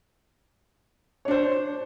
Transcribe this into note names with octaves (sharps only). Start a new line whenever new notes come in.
D4 C5 C#5